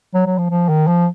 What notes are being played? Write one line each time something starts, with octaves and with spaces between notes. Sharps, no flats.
F#3
F#3
F3
F3
D#3
F3